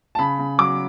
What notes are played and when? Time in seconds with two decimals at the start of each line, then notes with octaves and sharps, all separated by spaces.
0.15 A5
0.19 C#3 B5
0.39 C#3
0.58 F#3 D6